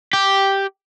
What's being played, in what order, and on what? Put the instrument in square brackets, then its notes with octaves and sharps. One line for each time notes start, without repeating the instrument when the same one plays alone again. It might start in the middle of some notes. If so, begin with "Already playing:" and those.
[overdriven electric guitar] G4